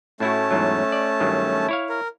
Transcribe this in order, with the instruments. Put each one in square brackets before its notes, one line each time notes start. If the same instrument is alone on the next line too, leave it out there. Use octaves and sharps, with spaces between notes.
[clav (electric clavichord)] A2 E4 F#4 [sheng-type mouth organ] A3 C#4 A5
[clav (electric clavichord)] E2 G#2 F#3
D5
G2 D#3 F#3
E4 C#5 F5
[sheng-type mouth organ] A#4